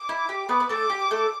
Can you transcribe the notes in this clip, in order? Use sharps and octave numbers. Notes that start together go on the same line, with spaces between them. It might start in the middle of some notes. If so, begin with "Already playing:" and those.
Already playing: D6
E4
G4
B3 B4
B4
A3 A4 D6
G4
A3 A4